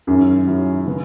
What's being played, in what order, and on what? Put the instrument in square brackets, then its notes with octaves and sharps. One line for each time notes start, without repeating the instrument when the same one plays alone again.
[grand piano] F#2 [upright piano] D#3 F#3 C#4 E4 G#4
[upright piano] D#3 F#3 C#4 E4 G#4
C#3 G#3 B3